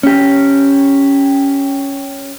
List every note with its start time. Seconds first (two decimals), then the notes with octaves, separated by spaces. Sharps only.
0.03 C#4 G4